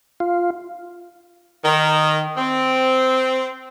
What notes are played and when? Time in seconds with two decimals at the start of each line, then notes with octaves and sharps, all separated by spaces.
0.20 F4
1.65 D#3
2.37 C4